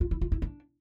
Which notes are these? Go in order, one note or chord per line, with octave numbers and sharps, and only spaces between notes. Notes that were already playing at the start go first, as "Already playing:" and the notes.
F4
E4
F4
E4
D4